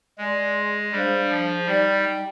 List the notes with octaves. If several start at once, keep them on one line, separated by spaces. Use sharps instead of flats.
G#3 G#4 D5 G#5 C6
G3 D4 G#4 C5 F5
F3
G3 D#4 G4 D5 G5